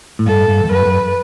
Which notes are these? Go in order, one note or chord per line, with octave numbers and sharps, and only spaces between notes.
A2
G2 A4
G2
E2
F#2 B4
F#2